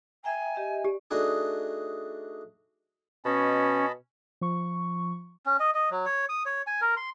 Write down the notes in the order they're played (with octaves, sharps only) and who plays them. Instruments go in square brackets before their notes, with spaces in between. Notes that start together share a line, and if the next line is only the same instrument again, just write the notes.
[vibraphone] E5 G5 A#5 [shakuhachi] G#5
[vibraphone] G4 D#5 E5
[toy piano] G4 [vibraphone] D5
[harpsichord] A3 D4 D#4 F#4 G#4
[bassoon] B2 [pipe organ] C#4 [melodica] D#5 A5 B5
[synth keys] F3 C#6
[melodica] C#4
D#5
D#5
F#3
C#5
D#6
C#5
G#5
A#4
C6